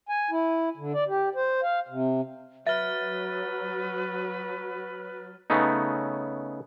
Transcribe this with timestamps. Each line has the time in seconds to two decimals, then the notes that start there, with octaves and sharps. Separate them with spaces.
0.09 G#5
0.31 E4
0.77 D3
0.94 D5
1.08 G4
1.35 C5
1.63 F5
1.89 C3
2.67 F#3 B4 E5 F6 A6
5.50 C#3 A3 B3 C#4 D#4